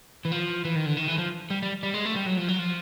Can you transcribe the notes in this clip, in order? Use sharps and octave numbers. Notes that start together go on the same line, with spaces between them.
E3
F3
E3
D#3
D3
D#3
E3
F3
G3
G3
G3
G#3
A3
G3
F#3
F3
F#3
F3